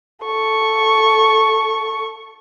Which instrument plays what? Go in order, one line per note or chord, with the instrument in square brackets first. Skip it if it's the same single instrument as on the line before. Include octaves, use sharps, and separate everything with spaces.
[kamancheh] A4 C#6